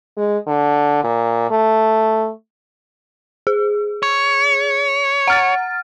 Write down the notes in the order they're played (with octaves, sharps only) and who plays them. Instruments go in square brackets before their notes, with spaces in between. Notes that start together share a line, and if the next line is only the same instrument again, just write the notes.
[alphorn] G#3
D3
A#2
A3
[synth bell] G#4
[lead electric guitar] C#5
[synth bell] F#5 F6 A6